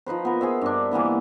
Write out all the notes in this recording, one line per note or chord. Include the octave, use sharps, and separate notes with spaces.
F3 D#4 B4 C5
B3 A#4
G#4 C5 E5
G2 D4
E3 A#3 B3 E4